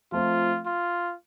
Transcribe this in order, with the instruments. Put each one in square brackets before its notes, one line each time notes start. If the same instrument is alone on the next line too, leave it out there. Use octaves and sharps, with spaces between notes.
[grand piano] F3 A3 C4 [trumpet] F4
[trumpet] F4